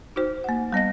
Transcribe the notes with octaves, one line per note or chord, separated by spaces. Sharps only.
D#4 F#4 C5
A#3 F#5
G3 B3 D#5 A#6